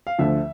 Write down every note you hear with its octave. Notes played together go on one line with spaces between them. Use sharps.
F5
D2 D3 F3 E5